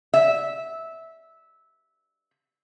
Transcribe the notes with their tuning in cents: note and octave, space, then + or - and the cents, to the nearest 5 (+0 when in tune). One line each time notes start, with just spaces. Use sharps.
E5 -15